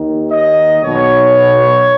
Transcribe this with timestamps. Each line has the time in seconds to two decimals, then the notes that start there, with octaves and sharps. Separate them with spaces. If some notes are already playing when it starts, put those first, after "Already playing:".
Already playing: D#2 D#3
0.31 D#5
0.83 B1 B2 C#5